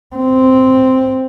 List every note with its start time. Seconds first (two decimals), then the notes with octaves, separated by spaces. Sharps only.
0.16 C4